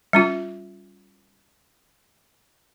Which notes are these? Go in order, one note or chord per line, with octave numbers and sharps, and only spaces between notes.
G3 C#4 F4